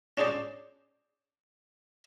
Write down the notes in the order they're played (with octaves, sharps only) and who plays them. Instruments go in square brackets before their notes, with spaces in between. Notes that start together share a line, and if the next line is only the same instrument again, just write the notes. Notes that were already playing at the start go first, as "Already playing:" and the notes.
[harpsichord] C#4 D4 G#4 C5 D5